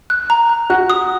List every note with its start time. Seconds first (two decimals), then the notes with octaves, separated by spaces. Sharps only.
0.10 F#6
0.30 A#5
0.49 F#6
0.70 F#4 F#6
0.90 D#6